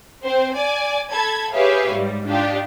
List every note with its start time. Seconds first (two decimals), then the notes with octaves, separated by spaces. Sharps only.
0.24 C4 C5
0.55 D5 G#5
1.12 A4 A5 B5 G#6
1.52 G4 G#4 B4 C#5 E5 F5
1.91 G#2 G3
2.28 D4 D#4 F4 G4